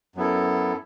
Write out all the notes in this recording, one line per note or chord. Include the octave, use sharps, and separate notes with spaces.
F#2 F#3 B3 E4 A4